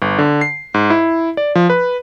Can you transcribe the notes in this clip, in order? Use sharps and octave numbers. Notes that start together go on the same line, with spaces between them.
G1
D3
C7
G#2
E4
D5
F3
B4